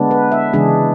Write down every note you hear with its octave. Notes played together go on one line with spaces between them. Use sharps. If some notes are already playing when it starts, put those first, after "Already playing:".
Already playing: D3 G#3 B3 D4
B4
E5
C#3 E3 G#3 D4 G#4